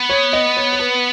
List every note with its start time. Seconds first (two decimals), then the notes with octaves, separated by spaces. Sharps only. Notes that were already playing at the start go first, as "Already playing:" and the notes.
Already playing: B3
0.09 C#5
0.33 D#5
0.57 C#5
0.73 C#5
0.79 B4